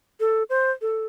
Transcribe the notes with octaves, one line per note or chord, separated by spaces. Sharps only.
A4
C5
A4